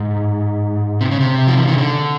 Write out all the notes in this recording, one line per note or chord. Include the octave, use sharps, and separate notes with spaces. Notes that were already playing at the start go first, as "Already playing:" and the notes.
Already playing: G#2
C3
C#3
C3
F3
E3
D#3
D3